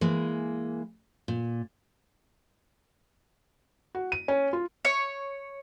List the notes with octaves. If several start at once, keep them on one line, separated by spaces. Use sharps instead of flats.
E3 G#3 A#3
A#2
F#4
D#7
C#4
F4
C#5